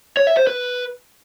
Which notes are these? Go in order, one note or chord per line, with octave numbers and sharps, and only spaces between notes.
C#5
E5
C5
B4